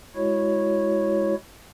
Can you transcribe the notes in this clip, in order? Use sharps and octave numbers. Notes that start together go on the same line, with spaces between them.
G#3 E4 F#4 C#5